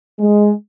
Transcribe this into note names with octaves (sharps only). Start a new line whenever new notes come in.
G#3